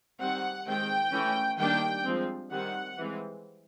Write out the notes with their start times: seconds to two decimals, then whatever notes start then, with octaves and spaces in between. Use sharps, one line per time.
0.20 D#3 G3 C4 F#5
0.67 D#3 G#3 C4 G5
1.13 E3 A3 C#4
1.59 D#3 G3 A#3 D4 G5
2.06 F3 G#3 C4
2.51 D#3 G3 C4 F#5
2.97 E3 G#3 C4